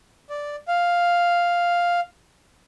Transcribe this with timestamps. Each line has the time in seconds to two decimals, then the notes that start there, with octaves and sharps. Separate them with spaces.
0.30 D5
0.68 F5